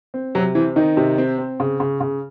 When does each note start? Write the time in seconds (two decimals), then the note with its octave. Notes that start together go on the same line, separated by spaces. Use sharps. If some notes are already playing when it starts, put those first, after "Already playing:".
0.14 C4
0.35 C3 F#3
0.55 E3 C4
0.76 D#3 D#4
0.97 C3
1.18 C4
1.38 C4
1.60 C#3
1.80 C#3
2.01 C#3